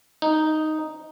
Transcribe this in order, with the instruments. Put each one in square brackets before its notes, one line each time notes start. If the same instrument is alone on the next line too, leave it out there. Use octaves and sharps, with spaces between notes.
[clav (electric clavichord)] D#4